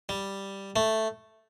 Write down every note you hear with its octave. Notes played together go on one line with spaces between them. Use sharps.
G3
A3